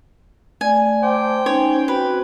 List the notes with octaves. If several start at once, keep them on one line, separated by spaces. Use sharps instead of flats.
A3 D5 G#5
A3 C5 G5 A5 D6
C#4 D#4 C#5 G#5
C4 F#4 B4